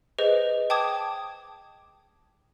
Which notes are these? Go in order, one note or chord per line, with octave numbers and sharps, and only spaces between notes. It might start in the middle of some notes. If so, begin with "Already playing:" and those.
G#4 B4 C5 D#5
G5 A5 D6 D#6 G#6